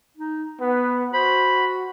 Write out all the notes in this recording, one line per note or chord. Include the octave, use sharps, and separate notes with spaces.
D#4
B3 B4
F#4 C5 B5